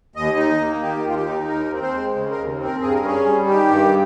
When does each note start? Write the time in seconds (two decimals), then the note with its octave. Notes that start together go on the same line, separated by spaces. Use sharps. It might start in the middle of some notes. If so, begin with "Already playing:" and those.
0.16 D#2 D#5
0.37 D#4
0.61 A#3
0.82 D#3 G4
1.04 D#2 F4
1.16 G4
1.27 D#4
1.48 D#2 A#4
1.71 C4
1.82 C5
1.94 G#3
2.16 C#3
2.31 A#4
2.38 D#2
2.59 C4
2.65 A#4
2.82 G2 G#4
2.94 A#4
3.04 C#4 G#4
3.26 G3
3.48 D#3 G4
3.70 G2